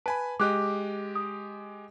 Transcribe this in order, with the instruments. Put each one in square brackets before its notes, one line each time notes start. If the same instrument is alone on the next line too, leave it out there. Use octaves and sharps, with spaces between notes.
[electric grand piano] B4 G#5 B5 [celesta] A5
[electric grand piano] G#3 G4 D#5 [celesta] D6 F#6
[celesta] D#6